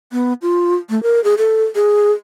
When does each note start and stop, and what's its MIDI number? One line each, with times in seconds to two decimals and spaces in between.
0.12 0.33 59
0.42 0.75 65
0.90 1.02 57
1.03 1.22 70
1.24 1.35 68
1.38 1.64 69
1.75 2.12 68